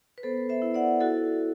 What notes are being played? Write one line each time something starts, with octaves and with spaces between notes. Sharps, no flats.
B4
B3 A4 C5
C5 E5
E4
D5 F#5
E4 F#4 A4